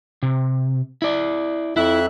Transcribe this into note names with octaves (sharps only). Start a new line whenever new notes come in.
C3
E4 D5
F2 E4 E5 F#6